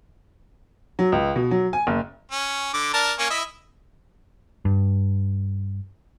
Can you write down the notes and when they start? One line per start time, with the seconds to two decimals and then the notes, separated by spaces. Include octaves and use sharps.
0.99 F#3
1.12 C#2
1.36 B2
1.51 F#3
1.73 G#5
1.87 F#1
2.32 C#4
2.74 D3 D6
2.94 D4 A#4 A5
3.19 A#3 C#4 G#5
3.30 E4 D#5 E5
4.65 G2